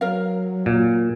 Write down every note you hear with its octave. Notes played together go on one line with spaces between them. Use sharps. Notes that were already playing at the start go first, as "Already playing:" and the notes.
F#3 A#4 F5
A#2